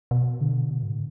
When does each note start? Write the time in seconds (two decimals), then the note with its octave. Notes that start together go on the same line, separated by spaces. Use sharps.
0.11 B2
0.41 D3
0.71 B2
0.83 G#2
0.92 A2